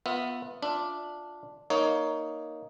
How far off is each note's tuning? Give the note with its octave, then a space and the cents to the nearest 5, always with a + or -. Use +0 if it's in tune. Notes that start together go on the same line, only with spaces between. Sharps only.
B3 +0 F4 +25 E5 +0
D4 +0 F4 +10 E5 +10
A#3 +5 D#4 +5 C#5 +15